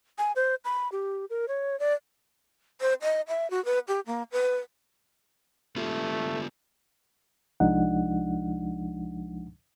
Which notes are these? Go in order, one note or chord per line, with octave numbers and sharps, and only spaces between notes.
G#5
C5
B5
G4
A#4
C#5
D5
C5
D#5
E5
F#4
B4
G4
A#3
B4
A3 B3 F4 G4
C2 F3 G#3 D4 D#4 F#5